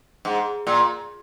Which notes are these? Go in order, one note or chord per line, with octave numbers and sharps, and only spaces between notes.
G#2
A#2